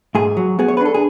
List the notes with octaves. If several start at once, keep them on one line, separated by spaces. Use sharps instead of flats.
G#2 G#4
F#3
B3 G#4
C#5
B4
D4 A4
G#4